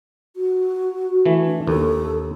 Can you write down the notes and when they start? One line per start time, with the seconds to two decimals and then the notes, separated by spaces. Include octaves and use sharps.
0.36 F#4
1.26 E3 A3
1.46 D4
1.67 D#2 A4